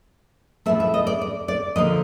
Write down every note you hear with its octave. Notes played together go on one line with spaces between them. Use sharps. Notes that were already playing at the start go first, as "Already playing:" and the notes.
A2 F3 A3 E5
E5
D#5
D5
D5
D5
D3 F3 A#3 D#5